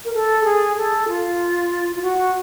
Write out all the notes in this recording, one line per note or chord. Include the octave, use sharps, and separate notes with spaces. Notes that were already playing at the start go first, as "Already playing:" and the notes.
A#4
A4
G#4
A4
F4
F4
F#4